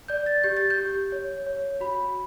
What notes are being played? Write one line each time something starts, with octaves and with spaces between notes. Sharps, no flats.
D5 G6
A6
G4 G6
A6
G6
G4
C#5
C#5
F#4 B5